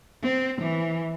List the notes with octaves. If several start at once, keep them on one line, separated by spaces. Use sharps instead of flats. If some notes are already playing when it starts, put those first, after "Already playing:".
C4
E3